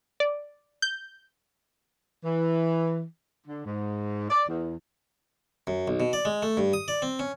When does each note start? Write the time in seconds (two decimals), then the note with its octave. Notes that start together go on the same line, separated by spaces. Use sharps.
0.20 D5
0.82 G6
2.25 E3
3.47 D3
3.65 G#2
4.29 D5
4.49 E2
5.67 F#2
5.88 B1
6.00 B2
6.13 D5
6.25 G#3
6.42 A3
6.57 G2
6.73 D#6
6.88 D5
7.02 C4
7.19 C#4